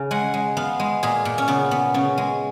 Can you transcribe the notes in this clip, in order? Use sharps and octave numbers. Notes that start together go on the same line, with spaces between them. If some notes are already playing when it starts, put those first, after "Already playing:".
Already playing: C#3
G#3 F#5
G#3
B3 F5
G#3
A#2 G#4
A#2
C#4
C#3 B3
B3
C#3 C#4
G#3